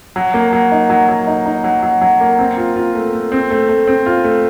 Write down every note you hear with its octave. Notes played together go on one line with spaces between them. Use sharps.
F#3
A#3
F#3
D#4
F#3
F#3
D#4
D#4
F#3
F#3
F#3
A#3
C4
F4
F4
A3
A3
C4
A3
A3
C4
F4
A3